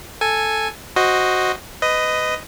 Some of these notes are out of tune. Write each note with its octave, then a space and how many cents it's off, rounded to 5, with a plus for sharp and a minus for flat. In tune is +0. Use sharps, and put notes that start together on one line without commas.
A4 +0 G#5 +0
F#4 +0 C5 +0 D#5 +0
B4 +25 D#5 +0